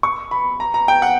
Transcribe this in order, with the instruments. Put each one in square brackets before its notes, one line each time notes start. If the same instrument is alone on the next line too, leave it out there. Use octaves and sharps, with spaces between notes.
[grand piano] C#6
B5
A#5
A#5
G5
F#5